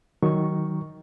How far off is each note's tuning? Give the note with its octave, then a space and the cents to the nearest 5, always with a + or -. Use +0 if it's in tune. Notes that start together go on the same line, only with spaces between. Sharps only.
D#3 +5 F#3 +15 C#6 +0